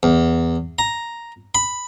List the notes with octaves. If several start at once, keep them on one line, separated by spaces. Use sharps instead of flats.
E2
A#5
B5